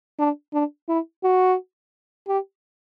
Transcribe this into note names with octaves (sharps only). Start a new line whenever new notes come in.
D4
D4
E4
F#4
G4